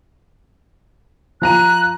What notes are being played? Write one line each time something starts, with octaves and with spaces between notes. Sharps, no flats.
F3 A#5 F#6 D#7